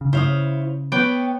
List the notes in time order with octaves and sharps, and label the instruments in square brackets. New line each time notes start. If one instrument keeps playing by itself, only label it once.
[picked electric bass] C#3
[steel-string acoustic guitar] E4 C#5 F5 [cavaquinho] C5 D#6
[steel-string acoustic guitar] B3 C#5 [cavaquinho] B4 G5 D6